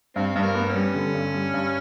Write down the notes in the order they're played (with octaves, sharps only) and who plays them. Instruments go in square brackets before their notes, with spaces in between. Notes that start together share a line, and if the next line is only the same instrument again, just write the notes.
[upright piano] G2 [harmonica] C4
[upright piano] G2 [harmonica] B3
[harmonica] A#3
[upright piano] B3
[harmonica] C#4
[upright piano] G3
D3
G2
G3
G2